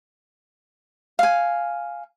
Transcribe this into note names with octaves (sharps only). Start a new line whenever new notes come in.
F5 G#5